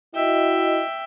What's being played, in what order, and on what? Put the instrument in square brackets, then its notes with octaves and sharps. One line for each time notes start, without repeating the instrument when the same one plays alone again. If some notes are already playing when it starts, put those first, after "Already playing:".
[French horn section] E4 F#4 D#5 [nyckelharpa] E5 G5